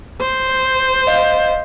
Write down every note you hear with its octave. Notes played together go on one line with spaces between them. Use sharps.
C5
D#5 F5